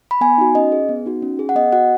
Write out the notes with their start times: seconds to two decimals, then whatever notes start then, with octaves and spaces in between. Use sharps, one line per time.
0.11 B5
0.21 B3 G#5
0.38 D#4 F#4
0.55 C#4 D#5
0.72 G#4
0.89 B3
1.06 D#4 F#4
1.22 C#4
1.39 G#4
1.49 F#5
1.55 B3 D#5
1.72 F#4 F#5